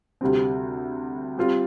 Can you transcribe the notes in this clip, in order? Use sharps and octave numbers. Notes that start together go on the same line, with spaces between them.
D2 C3 G3 C4
G3 C4 F4